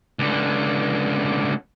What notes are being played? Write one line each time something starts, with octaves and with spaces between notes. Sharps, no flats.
C#2 D3